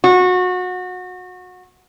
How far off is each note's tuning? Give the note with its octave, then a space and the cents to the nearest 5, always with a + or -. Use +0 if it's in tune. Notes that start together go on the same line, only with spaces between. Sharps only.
F#4 -25